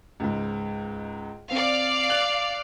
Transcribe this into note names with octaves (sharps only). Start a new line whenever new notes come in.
C#2 G#2
C4 D5 F5
F#6 F7 F#7